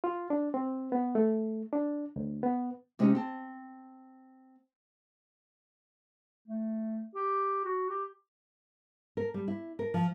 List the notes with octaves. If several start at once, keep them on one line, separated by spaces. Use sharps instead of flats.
F4
D4
C4
B3
A3
D4
D2
B3
C3 G#3 C4 C#4 D#4 G4
C4 A5
A3
G4
F#4
G4
A#4
G3
E4
A#4
F3